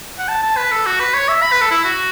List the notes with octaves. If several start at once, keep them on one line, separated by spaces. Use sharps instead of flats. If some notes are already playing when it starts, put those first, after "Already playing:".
F#5
A5
A5
B4
A4
F#4
B4
C#5
E5
B5
B4
A4
E4
F#4